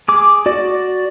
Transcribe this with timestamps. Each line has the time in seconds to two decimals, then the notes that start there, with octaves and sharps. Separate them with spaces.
0.08 G#4 D6
0.46 F#4 D5